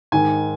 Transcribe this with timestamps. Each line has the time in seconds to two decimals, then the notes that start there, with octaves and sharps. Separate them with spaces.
0.12 G#2 D#3 G#5